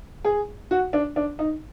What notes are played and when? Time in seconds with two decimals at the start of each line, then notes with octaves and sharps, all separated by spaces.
0.24 G#4
0.71 F#4
0.93 D4
1.16 D4
1.39 D#4